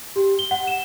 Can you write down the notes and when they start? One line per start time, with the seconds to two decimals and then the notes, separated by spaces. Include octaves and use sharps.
0.16 G4
0.39 G7
0.51 F#5
0.67 E7